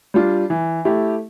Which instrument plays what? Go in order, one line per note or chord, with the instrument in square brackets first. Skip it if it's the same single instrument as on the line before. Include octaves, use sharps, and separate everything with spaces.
[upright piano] G3 D4 F4
E3
A3 E4 G4